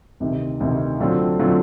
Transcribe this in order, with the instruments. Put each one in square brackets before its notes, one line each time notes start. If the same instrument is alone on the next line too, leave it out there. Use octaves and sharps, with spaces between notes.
[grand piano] D2 C3 D#3
D2 C3 D#3
D3 F#3 A3 C4 F4
D3 F#3 A3 C4 F4